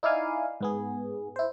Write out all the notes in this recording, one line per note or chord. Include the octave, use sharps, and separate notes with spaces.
D#4 E4 D5 F5 G#5
G#2 B3 G#4
E4 C5